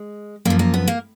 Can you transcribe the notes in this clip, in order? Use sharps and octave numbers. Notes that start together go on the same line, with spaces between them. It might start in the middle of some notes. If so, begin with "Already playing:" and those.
Already playing: G#3
F#2 F3 A#3
A#3
B3
A#3